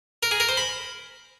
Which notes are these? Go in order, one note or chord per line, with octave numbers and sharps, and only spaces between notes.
A#4
G#4
A#4
C5
B5